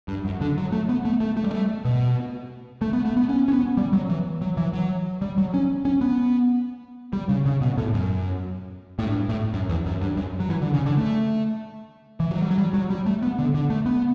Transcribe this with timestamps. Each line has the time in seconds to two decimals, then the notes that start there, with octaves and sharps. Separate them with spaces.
0.08 G2
0.25 F#2
0.41 D3
0.57 F#3
0.72 A3
0.89 B3
1.05 A3
1.20 A3
1.37 A3
1.44 G3
1.51 A3
1.85 B2
2.81 A3
2.93 B3
3.05 A3
3.17 B3
3.29 C#4
3.48 C#4
3.53 B3
3.77 G3
3.93 F#3
4.09 E3
4.41 F#3
4.57 E3
4.73 F#3
5.21 G3
5.38 F#3
5.54 C#4
5.85 C#4
6.01 B3
7.13 G3
7.29 C#3
7.46 C#3
7.61 B2
7.77 A2
7.93 F#2
8.99 A2
9.05 G2
9.29 A2
9.54 F#2
9.69 E2
9.86 F#2
10.01 G2
10.17 F#2
10.40 F#3
10.50 E3
10.62 D3
10.74 C#3
10.86 D3
10.97 A3
12.20 E3
12.31 F#3
12.42 G3
12.51 F#3
12.58 G3
12.74 F#3
12.90 G3
13.06 A3
13.22 B3
13.39 D3
13.54 D3
13.70 A3
13.86 B3